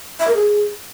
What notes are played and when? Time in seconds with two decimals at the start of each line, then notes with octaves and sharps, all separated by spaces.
0.20 E5
0.27 A#4
0.35 G#4